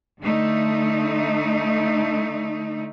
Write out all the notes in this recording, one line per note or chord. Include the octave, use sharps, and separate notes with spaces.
D3 A3 D#4